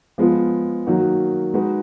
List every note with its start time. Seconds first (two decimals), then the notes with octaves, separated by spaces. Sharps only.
0.18 F3 G#3 B3 F4
0.87 D#3 F#3 A#3 D#4 F#4
1.54 G#3 D#4 F#4 B4